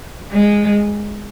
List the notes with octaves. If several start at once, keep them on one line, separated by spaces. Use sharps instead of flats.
G#3